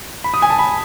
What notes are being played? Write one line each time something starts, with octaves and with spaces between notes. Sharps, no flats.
B5
D#6
G#5
A5
B5